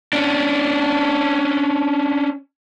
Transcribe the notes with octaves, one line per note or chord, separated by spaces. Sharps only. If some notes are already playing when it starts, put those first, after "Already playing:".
C#4 D4